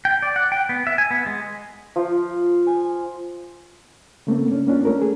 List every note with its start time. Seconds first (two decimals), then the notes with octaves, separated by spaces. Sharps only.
0.05 G5
0.22 D5
0.36 F#5
0.52 G5
0.69 B3
0.87 E5
0.98 G#5
1.11 B3
1.26 G#3
1.96 F3
2.67 G#5
4.27 C#3 A3 A#3 C4
4.51 C#4 D4
4.67 A#3 C#4 D4 F4
4.85 A3 C#4 A4 A#4
5.01 G#4